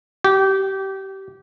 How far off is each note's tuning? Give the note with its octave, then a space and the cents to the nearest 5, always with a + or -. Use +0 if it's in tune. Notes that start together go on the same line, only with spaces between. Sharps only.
G4 -25